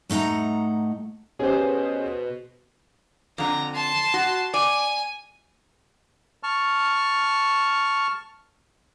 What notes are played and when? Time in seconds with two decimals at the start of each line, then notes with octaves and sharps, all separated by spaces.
0.10 A2 A3 D#4 F#5 A#5
1.39 B2 C#4 G4 G#4 C5
3.38 F2 D3 A#5
3.75 A5 C6
4.14 F#4
4.54 D5 G#5
6.43 A5 C#6 F6